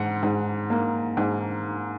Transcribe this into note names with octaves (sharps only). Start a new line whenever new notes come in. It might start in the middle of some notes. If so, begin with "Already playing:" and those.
Already playing: G#2 F#5
G#2
A#3
G#2